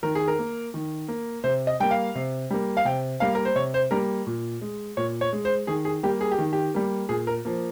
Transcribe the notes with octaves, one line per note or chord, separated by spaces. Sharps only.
D#3 A#4
G#4
A#4
A#3
D#3
A#3
C3 C5
D#5
G3 A#3 G5
F5
C3
G3 A#3
F5
C3 G5
G3 A#3 F5
A#4
C5
C3 C#5
C5
G3 A#3 A#4
A#2
G#3
A#2 C#5
C#5
G#3
C5
D#3 G#4
G#4
G3 A#3 G4
G#4
G4
D#3
G4
G3 A#3
A#2 G#4
A#4
F3 A#3